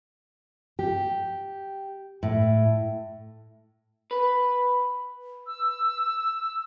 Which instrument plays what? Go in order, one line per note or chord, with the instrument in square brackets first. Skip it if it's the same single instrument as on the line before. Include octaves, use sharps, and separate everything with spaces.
[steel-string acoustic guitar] G4
A2
[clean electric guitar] B4
[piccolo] E6